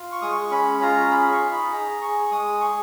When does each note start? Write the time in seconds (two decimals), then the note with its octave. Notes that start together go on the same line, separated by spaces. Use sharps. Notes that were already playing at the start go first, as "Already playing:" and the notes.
Already playing: F4
0.12 C#6
0.22 G#3 D#6
0.32 C#6
0.51 C#4 B5
0.82 F4 A#5
1.11 G#4 B5
1.32 C#6
1.42 D#4
1.51 B5
1.71 G#4 A#5
2.01 G#4 C#6
2.25 C#6
2.31 G#3 D#6
2.61 G#4 C#6